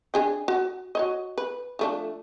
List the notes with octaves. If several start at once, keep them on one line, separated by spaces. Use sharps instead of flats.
D4 G#4 G5
F#4
F#4 C#5 D#5
B4
F3 A3 D4